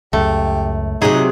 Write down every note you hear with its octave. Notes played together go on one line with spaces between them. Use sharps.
C#2 F#2 A3 G4
C3 F#3 D#4 G#4